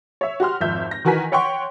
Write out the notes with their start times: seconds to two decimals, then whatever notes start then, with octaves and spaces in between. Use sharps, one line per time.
0.21 C#5 E5
0.40 F#4 G4 C6 F6
0.61 G#1 F2 E5 G6
0.91 A#6
1.05 D#3 E3 F#4 A#4 G#5 B6
1.32 C#5 F#5 G5 C6 C#6